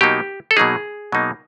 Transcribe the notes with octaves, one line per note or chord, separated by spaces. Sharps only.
B2 F#3 A#3 D#4 G4
A4
B2 F#3 A#3 D#4 G#4
B2 F#3 A#3 D#4